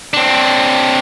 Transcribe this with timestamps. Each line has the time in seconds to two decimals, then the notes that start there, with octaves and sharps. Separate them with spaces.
0.14 C4 D4